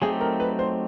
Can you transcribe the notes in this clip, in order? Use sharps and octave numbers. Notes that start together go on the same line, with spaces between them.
F#3 A3 C4 D#4 G4 G#4
A#4
B4
C5